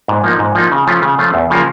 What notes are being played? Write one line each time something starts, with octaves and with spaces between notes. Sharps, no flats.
G#2
F3 A#3 D#4
G#2
F3 A#3 D#4
C#3
F3 A3 C#4 F4
C#3
F3 A3 C#4 F4
E2
C#3 F3 A#3